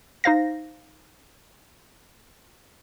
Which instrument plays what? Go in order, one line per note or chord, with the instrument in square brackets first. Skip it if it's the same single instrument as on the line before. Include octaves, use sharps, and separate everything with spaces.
[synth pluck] D#4 C5 F5 A#6